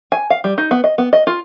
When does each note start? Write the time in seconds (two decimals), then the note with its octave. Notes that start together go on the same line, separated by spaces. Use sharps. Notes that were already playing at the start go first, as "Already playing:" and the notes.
0.12 G#5
0.30 F5
0.44 G3
0.58 D#4
0.71 B3
0.84 D#5
0.98 B3
1.13 D#5
1.27 F4